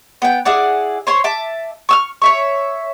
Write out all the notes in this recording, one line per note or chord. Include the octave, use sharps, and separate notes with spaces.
B3 G5
E4 G#4 D5 F#5
C5 C#5 C6
E5 A5 D6
C#6 E6 F6
C#5 E5 C#6